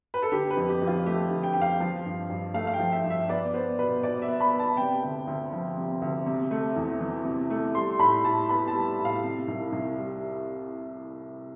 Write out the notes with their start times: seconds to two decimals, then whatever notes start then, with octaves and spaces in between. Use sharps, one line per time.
0.14 B4
0.22 A4
0.32 D3 G4
0.51 B4
0.57 F2
0.69 G4
0.82 F2
0.87 F4
1.06 A3 G4
1.31 D3
1.43 G5
1.54 F2 G5
1.61 F5
1.80 F3
2.05 G2
2.30 G2
2.54 A3 F5
2.67 F5
2.73 G5
2.79 F3
2.92 E5
3.04 G2
3.10 E5
3.29 B3 D5
3.54 B3 C5
3.79 B2 B4
4.03 B2 D5
4.22 E5
4.28 B3
4.40 B5
4.53 B3
4.59 A5
4.77 C3 G5
5.02 D2
5.27 D2
5.52 F3
5.77 C3
6.02 D2
6.26 C3
6.51 A3
6.76 E2
7.00 E3
7.25 C3
7.50 A3
7.75 G3 C6
7.99 A2 B5
8.24 A2 A5
8.49 B3 B5
8.68 A5
8.74 G3
8.99 A2
9.05 F5
9.24 C3
9.48 C2
9.73 C2
9.98 G3